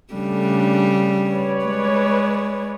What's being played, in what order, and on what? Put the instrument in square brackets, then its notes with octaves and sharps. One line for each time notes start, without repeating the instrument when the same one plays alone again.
[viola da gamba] C#3 G3 [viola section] A3 D4
[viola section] B4 C#5 D5
[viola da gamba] G#3